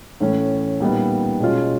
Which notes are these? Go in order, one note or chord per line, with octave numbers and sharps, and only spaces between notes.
A2 E3 A3 C#4
A#2 G3 B3 D#4
B2 G#3 C#4 F4